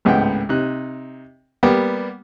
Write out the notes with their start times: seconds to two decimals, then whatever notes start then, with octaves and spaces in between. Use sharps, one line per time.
0.05 G#1 C#2 A2 B3 F#5 G5
0.49 C3 D#4 F#6
1.63 G3 A#3 B3 G4